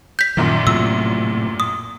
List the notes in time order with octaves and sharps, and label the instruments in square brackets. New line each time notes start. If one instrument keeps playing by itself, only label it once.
[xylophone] G6 B6
[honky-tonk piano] A#1 F#2 A#2 [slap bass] D#3
[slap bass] A2 C3 F#3 [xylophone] E6
[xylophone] D#6